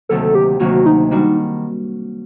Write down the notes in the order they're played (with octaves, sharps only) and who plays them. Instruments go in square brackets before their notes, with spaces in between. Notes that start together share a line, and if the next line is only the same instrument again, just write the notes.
[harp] D2 C3 D#3 F#3 A#3 [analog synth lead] A4
[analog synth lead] G4
[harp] D2 C3 D#3 F#3 A#3 [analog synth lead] F#4
[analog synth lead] D#4
[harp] D#3 G3 D4 F#4 [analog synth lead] D#4